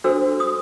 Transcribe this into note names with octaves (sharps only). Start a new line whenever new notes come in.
D4 F#4 A4 C5 E6
D#6